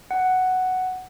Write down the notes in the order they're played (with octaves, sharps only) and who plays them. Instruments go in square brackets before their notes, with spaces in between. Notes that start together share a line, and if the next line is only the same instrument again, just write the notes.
[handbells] F#5